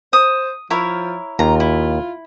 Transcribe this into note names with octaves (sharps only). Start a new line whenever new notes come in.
C5 D#6
F3 E4 A#4 C#5
D#2 F4 A#5
E4